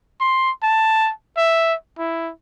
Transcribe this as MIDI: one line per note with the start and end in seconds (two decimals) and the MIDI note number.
0.21 0.51 84
0.63 1.11 81
1.37 1.75 76
1.99 2.31 64